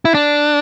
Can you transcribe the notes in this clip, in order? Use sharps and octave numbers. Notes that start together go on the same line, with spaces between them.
E4
D4